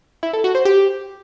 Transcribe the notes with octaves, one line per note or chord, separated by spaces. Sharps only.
E4
A4
F#4
C5
G4